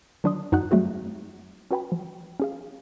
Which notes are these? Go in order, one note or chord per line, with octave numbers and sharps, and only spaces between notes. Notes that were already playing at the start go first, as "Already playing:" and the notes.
D#3 F#3 D4 D5 C6 D#6
F#2 D#4 F#4 F#5 F#6
F#3 G3 A3 C4 F#4 G#4
C#4 F#4 B4 G5 G#5 B5
F3
C#4 G#4 F5